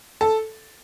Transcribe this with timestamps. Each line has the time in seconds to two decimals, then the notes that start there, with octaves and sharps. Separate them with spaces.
0.21 A4